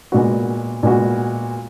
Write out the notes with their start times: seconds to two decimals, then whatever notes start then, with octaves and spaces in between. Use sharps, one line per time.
0.12 A#2 G#3 B3 F#4
0.83 A#2 G#3 B3 F#4